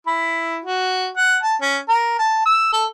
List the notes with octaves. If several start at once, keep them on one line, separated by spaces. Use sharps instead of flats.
E4
F#4
F#5
A5
C#4
A#4
A5
E6
A4